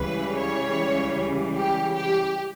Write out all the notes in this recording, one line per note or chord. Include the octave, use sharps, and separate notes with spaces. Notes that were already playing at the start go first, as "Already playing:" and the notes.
Already playing: C#2 C#3 E3 G3 B4
C#5
G4
G4